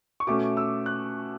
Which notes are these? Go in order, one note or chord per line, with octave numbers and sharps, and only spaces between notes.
C#6
B2 A3 C#4 D6
E6
F#6